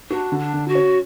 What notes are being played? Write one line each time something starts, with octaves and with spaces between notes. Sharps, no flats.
D4 F#4
D3
D4
D3
F#4
C#4